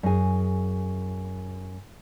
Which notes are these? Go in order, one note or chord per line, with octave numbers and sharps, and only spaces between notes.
F#2 G#4